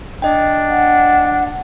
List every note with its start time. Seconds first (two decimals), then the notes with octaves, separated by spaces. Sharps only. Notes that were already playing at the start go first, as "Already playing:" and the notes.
0.22 D4 D#5 G5
0.68 F#5